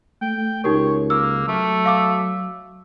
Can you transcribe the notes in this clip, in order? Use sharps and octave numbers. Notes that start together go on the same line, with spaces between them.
A3 G5
C#2 D#4 G4 A#4 C#5
A#3 E6
F#3 A3
F5 D6 E6